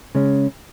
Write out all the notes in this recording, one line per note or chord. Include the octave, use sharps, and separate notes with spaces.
C#3 G#3 C#4